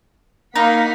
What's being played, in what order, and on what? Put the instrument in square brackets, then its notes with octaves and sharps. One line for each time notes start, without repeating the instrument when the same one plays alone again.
[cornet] A#3 [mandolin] D#4 [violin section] F5 F#5 B6